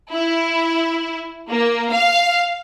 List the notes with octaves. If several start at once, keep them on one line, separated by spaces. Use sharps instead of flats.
E4
A#3
F5